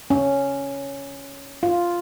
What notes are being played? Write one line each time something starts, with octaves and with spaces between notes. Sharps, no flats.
C#4
F4